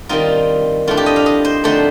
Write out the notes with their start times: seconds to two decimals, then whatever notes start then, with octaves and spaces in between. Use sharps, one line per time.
0.09 D#3 G3 C4 D#4 F4
0.88 A2 A3 D4 F4
0.97 G4
1.06 D#5
1.16 F5
1.26 D#5
1.45 C5
1.64 D3 F3 A3 C4 D#4 C5